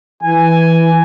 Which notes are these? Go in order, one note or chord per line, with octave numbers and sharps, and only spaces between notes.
E3 G#5